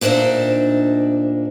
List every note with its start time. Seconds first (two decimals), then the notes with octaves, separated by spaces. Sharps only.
0.01 D2 A#2 D4 D#4 C5 E5